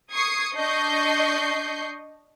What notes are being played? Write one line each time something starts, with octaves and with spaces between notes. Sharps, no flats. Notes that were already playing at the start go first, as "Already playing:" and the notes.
C#6 D#6 G#6 C7 C#7
D4 D#5 C#6 G6 C7